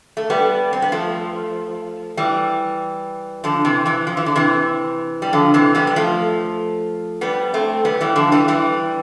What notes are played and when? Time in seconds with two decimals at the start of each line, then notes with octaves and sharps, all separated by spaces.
0.17 A3
0.30 G3 B3
0.73 C4
0.82 B3
0.92 F3 A3
2.17 E3 G3
3.44 D3 F3
3.65 C3 E3
3.86 C3 E3
4.07 F3
4.17 E3
4.26 D3
4.35 C3 E3
5.22 G3
5.33 D3 F3
5.54 C3 E3
5.75 G3 B3
5.87 B3
5.96 F3 A3
7.21 G3 B3
7.54 A3 C4
7.85 G3 B3
8.01 E3 G3
8.16 D3 F3
8.32 E3 G3
8.48 E3 G3